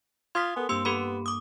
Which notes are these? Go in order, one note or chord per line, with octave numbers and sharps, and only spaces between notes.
F4 C6 D#6 F6 G#6 B6
B3 A4 A#4 G#5
G2 A#3 C4 G4 C6 E6
B3 G4 A4 B5
D6 D#6